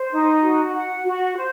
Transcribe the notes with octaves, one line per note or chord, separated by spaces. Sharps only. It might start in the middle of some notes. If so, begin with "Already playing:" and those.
Already playing: C5
D#4
F#4
F#5
F#4
C5